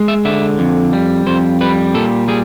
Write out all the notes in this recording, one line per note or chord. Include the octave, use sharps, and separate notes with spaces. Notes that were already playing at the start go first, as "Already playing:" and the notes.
Already playing: G#3
E5
D3 E5
F2
G3
F2 C5
G3 B4
A#2 A4
G3 G#4